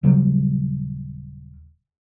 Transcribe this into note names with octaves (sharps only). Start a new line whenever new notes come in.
D#1 C#3 F#3 G3